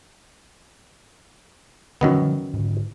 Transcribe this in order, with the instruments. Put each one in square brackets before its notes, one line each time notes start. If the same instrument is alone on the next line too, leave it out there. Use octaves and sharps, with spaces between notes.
[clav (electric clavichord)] F#2 D#3 B3 [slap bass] D3 F3 G3
[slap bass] G#2 D3